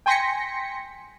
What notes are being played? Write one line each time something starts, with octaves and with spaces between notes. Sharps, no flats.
G5 G#5 C6 A#6 B6 C#7